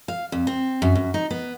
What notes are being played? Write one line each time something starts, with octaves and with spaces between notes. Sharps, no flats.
F5
F2
C4
F#2
F#2
D#4
B3